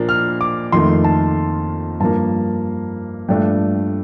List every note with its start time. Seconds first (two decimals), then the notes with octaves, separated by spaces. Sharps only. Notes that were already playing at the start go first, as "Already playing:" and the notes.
Already playing: A#2 F3 A#3 D4
0.09 F6
0.41 D6
0.72 F2 D#3 A3 C6
1.04 A5
2.00 G2 F3 A#3 A5
3.28 G2 F3 A3 D4 G5